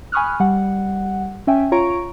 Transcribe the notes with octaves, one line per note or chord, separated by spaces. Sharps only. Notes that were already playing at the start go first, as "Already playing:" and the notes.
G#5 B5 C#6 D#6 F6 F#6
G3 F#5
C#4 E5 G5 G#5
F4 C#5 A#5 C#6 D7